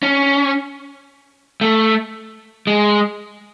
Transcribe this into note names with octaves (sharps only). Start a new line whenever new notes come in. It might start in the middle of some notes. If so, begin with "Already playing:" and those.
C#4
A3
G#3